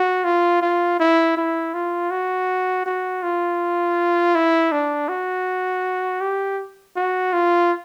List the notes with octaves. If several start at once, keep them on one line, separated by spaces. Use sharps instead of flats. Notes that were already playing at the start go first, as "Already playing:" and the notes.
Already playing: F#4
F4
F4
E4
E4
F4
F#4
F#4
F4
E4
D4
F#4
G4
F#4
F4